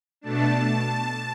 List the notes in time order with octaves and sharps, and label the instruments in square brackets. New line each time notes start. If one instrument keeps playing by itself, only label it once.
[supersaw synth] B2 A3 D4 A5